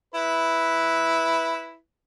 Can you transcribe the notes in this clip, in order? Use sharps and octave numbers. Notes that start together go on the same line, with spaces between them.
E4 B4